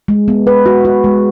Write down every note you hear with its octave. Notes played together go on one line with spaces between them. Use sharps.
G#3
B3
B4
F#4
F#4
G#3